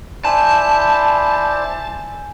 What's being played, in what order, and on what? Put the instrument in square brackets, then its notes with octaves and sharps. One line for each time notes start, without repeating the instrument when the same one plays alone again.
[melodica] E4 C5 [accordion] D5 B5 [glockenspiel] G#5 G6 E7 [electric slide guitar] A5